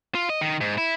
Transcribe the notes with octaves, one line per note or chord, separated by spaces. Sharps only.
F4
D#5
D#3
G#2
E4